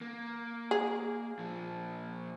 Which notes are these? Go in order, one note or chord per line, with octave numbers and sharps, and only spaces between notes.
A#3
G#4
A#2 F3